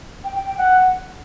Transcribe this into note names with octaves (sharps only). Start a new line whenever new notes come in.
G5
G5
G5
F#5